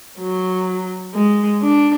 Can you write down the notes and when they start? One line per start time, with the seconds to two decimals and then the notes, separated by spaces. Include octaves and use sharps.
0.19 F#3
1.14 G#3
1.62 D4